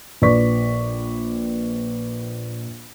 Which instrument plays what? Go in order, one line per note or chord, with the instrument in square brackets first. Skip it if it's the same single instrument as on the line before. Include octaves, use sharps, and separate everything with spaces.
[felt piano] A#1 B4 D5 C#6 B6